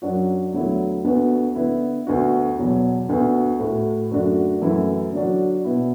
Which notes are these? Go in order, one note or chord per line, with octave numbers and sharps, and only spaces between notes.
F#2 F#3 D4 F#4
E2 D3 F#3 A3 E4
D2 D3 B3 F#4
D3 B3 E4
D2 D3 B3 F#4
E2 B2 F#3
D2 D3 B3 F#4
A2 A3 F#4
F#2 D3 A3 D4 F#4
F#2 E3 A3 E4
D3 F#3 D4 F#4
B2 B3 E4